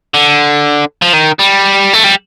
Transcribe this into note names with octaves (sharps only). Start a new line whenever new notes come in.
D3
F3
D#3
G3
A3
G3